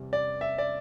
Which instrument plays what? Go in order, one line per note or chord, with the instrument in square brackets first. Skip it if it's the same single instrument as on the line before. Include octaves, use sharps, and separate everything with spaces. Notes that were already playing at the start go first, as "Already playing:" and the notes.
Already playing: [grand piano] E2 C3 G3
D5
E5
D5